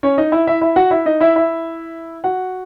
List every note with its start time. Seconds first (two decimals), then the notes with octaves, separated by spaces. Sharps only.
0.03 C#4 C#5
0.18 D#4 D#5
0.32 E4 E5
0.47 E4 E5
0.61 E4 E5
0.76 F#4 F#5
0.91 E4 E5
1.06 D#4 D#5
1.20 E4 E5
1.36 E4 E5
2.24 F#4 F#5